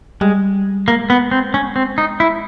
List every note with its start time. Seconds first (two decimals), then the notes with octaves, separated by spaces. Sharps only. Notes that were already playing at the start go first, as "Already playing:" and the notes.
0.21 G3 G#3
0.88 G#3 A#3
1.10 B3
1.31 C4
1.54 C#4
1.76 C4
1.98 D#4
2.20 E4